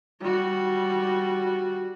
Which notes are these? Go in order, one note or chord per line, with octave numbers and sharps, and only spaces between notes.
G3 F#4